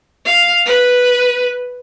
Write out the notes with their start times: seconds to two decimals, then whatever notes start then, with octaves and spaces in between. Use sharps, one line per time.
0.25 F5
0.66 B4